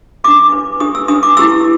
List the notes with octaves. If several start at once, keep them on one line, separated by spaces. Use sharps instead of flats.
D4 G4 B4 D6
D4 G4 B4
D4 G4 B4 D#6
E6
D4 G4 B4 D#6
D6
E4 G4 B4 E6